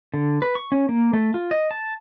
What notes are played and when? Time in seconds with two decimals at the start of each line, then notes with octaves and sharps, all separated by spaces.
0.14 D3
0.42 B4
0.55 C#6
0.72 C#4
0.89 A#3
1.13 A3
1.34 F4
1.51 D#5
1.71 A5